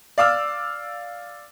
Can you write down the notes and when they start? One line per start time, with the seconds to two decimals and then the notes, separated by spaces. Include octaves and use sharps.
0.18 D5 F5 D6 E6 F6